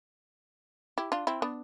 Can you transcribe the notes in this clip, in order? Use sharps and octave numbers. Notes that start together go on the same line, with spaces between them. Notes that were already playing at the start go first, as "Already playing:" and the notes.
E4 G4
D4 F4
C4 E4
B3 D4